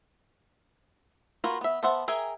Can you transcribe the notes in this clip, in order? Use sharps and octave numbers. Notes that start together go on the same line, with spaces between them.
A#3 F4 F#4 A#4 B4
B3 E5
B3 A4 C5 E5 F#5
G#4 A#4 E5 G5 G#5